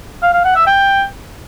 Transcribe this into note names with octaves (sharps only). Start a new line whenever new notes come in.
F5
F5
F#5
E5
G5